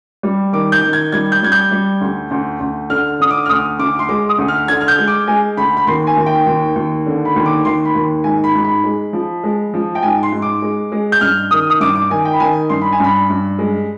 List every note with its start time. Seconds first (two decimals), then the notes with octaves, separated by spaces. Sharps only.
0.23 G3
0.53 D#3 D6
0.72 G6
0.83 D#3
0.93 G#6
1.12 G3 G#6
1.32 G6
1.42 G3 G#6
1.52 G6
1.71 G3
2.01 D2
2.31 D2
2.60 D2
2.90 D3 F6
3.20 D3 D#6
3.31 D6
3.46 F6
3.49 D2 D#6
3.79 D2 D6
3.99 C6
4.09 G#3 D6
4.29 D#6
4.38 D2
4.48 F6
4.68 D3 G#6
4.81 F6
4.88 G6
4.99 G#3
5.07 D6
5.28 G#3 G#5
5.57 D2 B5
5.77 B5
5.87 D#2 C6
6.07 G#5
6.17 D#2
6.26 G5
6.46 D#2
6.76 D#2
7.06 D3
7.25 B5
7.36 D#2
7.46 D6
7.65 D#2 C6
7.85 B5
7.95 D#2
8.24 G#2 G#5
8.44 B5
8.55 G#2
8.65 B5
8.84 G#3
9.13 F3
9.44 G#3
9.74 F3
9.95 G5
10.03 G#2 G#5
10.23 C6
10.32 G#2
10.42 D6
10.62 G#3
10.92 G#3
11.12 G6
11.21 G2 F6
11.51 D#3 D#6
11.70 D#6
11.80 G2 D6
11.95 D6
12.10 D#3 G#5
12.25 G5
12.33 B5
12.40 D#3 G#5
12.69 G2 C6
12.81 B5
12.92 G#5
13.00 G2 B5
13.29 G2
13.59 G#3